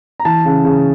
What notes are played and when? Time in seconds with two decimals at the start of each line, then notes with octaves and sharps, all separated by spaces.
0.20 A#5
0.25 E3 A5
0.45 C#3
0.65 C#3